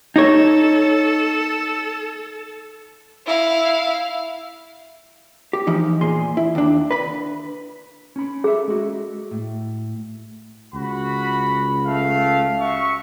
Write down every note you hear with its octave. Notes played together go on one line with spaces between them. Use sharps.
D#4 A4 C#5
E4 F5
G4
E3 F3 D#4
E2 A#2 G#4 C6
E4
D#2 D4
B4 B5
C#4 B5
G#4 A4 E5
G#3 F#4
A2
C#2 F#4 B5
A3 F5
F#4 E5 C#6